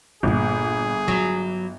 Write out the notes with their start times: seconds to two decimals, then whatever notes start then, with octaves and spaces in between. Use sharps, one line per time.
0.23 G1 A#2 A#3 G#4
1.08 F#3 D4